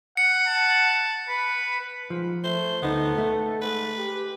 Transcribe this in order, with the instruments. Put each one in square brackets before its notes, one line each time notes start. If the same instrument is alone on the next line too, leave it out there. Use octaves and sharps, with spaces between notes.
[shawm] F#5 [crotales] C#7
[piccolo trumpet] A5
[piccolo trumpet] B4 [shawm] B5
[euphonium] G#2 [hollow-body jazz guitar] F3
[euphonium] A3 [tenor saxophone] C5
[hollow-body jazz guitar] D2 D#4 [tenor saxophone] B3 [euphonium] A4
[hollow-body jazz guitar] A3
[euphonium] G#2 [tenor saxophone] B4
[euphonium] G4